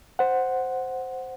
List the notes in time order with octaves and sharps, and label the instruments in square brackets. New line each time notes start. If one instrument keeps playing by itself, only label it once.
[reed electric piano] C5 F#5